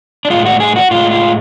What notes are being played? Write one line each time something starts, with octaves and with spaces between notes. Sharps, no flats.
D4
A2 G#3 F4
F#4
G#4
F#4
A2 G#3 F4
F4